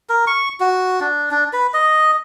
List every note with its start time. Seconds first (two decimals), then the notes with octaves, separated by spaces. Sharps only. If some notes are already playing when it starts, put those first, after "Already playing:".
0.09 A#4
0.27 C#6
0.60 F#4
1.00 D4
1.31 D4
1.53 B4
1.74 D#5